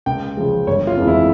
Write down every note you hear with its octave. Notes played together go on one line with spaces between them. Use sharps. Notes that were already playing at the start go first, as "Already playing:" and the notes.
C#2 G5
C#3 F3 G#3
G1 C#5
F4
F2 E3 G#3
E4